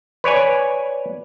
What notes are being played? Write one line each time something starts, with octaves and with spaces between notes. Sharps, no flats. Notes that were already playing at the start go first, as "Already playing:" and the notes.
B4 C#5 D5 G#5